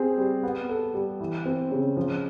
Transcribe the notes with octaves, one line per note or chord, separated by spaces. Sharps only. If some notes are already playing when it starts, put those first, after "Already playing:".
Already playing: C4 G#4
G3
B3
A4
G3
E3
C4
C#3
F3